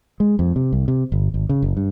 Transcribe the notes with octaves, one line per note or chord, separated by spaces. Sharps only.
G#3
F2
C3
C2
C3
G1
G#1
C#3
F#1
G2